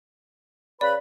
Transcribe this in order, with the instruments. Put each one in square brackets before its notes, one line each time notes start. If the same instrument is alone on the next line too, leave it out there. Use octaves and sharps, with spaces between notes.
[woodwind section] C#3 B4 B5 [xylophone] D5